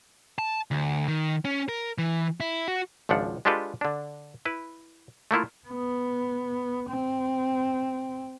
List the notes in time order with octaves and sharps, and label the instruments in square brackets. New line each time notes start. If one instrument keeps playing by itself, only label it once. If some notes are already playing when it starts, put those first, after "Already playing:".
[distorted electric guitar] A5
D2
D#3
C#4
A#4
E3
E4
F#4
[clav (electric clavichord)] G#1 C#2 F3 D4 F#5
G#3 D4 F4 G4 A4 B4
D3 D4
E4 B4
A3 A#3 E4 F4
[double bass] B3
C4